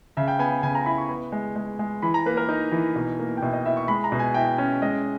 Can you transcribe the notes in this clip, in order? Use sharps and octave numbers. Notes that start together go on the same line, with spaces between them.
C#3 E5
G5
B3 G#5
C#3 G#5
A#5
E4 B5
C#6
B3
G#3
G#3
G#3
E3 B5
A#5
A#3 B4
A#4
D#4
E3
B2
A#3
G5
B2 E5
D#5
E4 E5
C#6
G#3 B5
A#5
B2
G#5
E4 G5
C#4
G#3 D#5